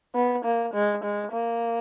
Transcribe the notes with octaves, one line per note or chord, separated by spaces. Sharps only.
B3
A#3
G#3
G#3
A#3